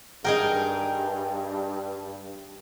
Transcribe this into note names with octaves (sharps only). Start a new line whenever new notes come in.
G2 D#4 G#4 A#4 G5